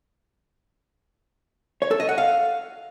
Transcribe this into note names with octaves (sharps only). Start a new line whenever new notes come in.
C#5
A4
D#5
F#5
F5